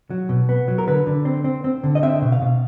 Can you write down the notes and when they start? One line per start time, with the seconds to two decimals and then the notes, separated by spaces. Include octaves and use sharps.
0.10 F#3
0.29 B2
0.49 B3
0.68 F#3
0.78 A#4
0.87 D3 B4
1.07 D3
1.25 C4
1.44 C4
1.64 C4
1.84 D3
1.95 D#5
2.03 C4 E5
2.22 B2
2.32 F5
2.42 B2